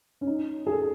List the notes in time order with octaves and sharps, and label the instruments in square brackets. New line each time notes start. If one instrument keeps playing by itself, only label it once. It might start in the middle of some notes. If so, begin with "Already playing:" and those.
[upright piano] C#4
D#4
G#4
A4